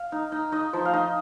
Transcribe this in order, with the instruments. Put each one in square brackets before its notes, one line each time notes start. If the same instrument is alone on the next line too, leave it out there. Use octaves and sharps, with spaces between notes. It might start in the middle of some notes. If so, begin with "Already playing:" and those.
Already playing: [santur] F5
D#4
D#4
D#4 D#5
F3 C5
F5
D#4 D#5